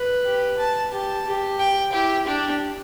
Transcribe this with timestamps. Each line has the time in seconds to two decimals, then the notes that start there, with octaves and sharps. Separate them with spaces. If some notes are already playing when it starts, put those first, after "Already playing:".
Already playing: B4
0.25 G4
0.58 A5
0.92 G4 A5
1.26 G4
1.59 G5
1.93 E4 G4
2.27 D4 G4